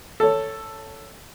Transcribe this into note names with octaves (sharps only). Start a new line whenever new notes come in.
A4 C#5